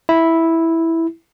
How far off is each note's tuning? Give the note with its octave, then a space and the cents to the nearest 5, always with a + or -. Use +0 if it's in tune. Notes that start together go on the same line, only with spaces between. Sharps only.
E4 -5